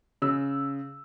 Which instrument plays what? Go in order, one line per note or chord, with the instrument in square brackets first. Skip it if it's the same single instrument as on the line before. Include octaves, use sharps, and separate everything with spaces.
[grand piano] C#3 E6